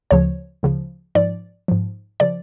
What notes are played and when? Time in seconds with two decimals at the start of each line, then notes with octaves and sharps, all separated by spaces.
0.11 D2 C#3 F3 C#5
0.63 D2 C#3 F3
1.15 G#2 F3 D5
1.68 G#2 F3
2.20 C#3 F3 D5